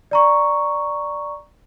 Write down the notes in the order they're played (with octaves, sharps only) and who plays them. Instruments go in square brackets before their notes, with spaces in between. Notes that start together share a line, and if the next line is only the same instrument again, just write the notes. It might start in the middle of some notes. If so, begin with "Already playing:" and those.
[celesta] D5 A#5 C#6